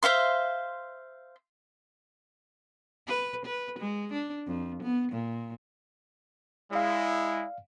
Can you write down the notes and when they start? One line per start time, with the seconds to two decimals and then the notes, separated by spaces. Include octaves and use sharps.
0.03 C5 E5 F5 C6
3.08 B4
3.45 B4
3.79 G#3
4.13 D4
4.47 F2
4.83 B3
5.12 A#2
6.71 G#3 E4 D5 F5